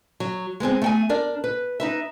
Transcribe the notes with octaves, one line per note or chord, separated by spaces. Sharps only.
F#3
G#3 B3 C4 G#4
A3 G5 G#5
D4 A#4 D5
B4
D#4 B4 E5